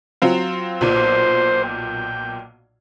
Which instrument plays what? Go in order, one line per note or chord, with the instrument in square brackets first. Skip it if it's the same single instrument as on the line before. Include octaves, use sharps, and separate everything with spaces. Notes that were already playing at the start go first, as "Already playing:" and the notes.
[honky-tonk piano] F#3 C4 F4
[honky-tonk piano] B1 A#2 [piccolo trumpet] C5
[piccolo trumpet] G5